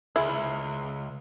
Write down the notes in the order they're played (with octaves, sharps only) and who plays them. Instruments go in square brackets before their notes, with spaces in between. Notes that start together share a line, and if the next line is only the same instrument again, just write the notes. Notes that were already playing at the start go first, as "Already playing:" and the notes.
[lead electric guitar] C#2 [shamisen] G#3 E4